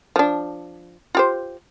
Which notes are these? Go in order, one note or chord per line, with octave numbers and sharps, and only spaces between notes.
F3 D4
F4 G4 C5